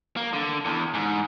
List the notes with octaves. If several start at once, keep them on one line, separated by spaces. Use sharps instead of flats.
A#3
D3
E2
G#2